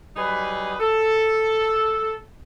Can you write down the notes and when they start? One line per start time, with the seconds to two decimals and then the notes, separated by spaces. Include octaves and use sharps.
0.17 F#3 G3 D#4 G#4 B4
0.80 A4